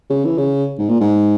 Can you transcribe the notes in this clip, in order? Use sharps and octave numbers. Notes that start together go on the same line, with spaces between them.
C#3
E3
C#3
G#2
A#2
G#2